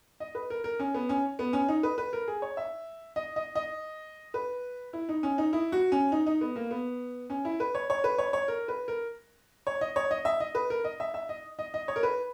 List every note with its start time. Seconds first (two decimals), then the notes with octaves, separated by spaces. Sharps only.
0.20 D#5
0.35 B4
0.50 A#4
0.64 A#4
0.80 C#4
0.94 B3
1.09 C#4
1.39 B3
1.53 C#4
1.68 D#4
1.83 B4
1.98 B4
2.13 A#4
2.28 G#4
2.42 C#5
2.57 E5
3.16 D#5
3.36 D#5
3.55 D#5
4.34 B4
4.93 E4
5.09 D#4
5.23 C#4
5.38 D#4
5.53 E4
5.72 F#4
5.92 C#4
6.12 D#4
6.27 D#4
6.41 B3
6.56 A#3
6.71 B3
7.30 C#4
7.45 E4
7.60 B4
7.75 C#5
7.90 C#5
8.04 B4
8.18 C#5
8.33 C#5
8.48 A#4
8.68 B4
8.88 A#4
9.67 C#5
9.81 D#5
9.96 C#5
10.11 D#5
10.25 E5
10.40 D#5
10.55 B4
10.70 A#4
10.84 D#5
11.00 E5
11.14 E5
11.29 D#5
11.59 D#5
11.74 D#5
11.88 C#5
11.96 A#4
12.03 B4